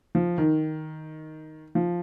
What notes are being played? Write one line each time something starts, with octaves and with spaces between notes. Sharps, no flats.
F3
D#3
F3